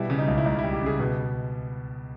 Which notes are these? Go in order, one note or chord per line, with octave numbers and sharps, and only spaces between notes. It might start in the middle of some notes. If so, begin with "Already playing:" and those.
Already playing: B2 G3 E4
C#3
D#4
C#2
E4
C#2 D#4
G3 E4
G4
C#3 G#4
B2